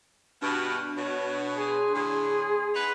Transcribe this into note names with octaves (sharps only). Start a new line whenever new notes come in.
G2 B2 D4 F6
B2 C#5
G#4
C6
A2 D3 G#4
B3 D#4 B4